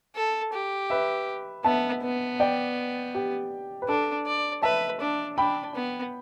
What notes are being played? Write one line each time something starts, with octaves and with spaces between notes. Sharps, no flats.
A4
G4
B4 E5
B3 E5 A5
B3
D5 G5
G4
B4
D4 A4
D5
B4 E5 A5
D4
D4 G5 B5
B3